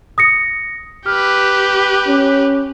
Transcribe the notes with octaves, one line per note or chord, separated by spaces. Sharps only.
D#6 A#6 C#7
G4 B4 F6
C#4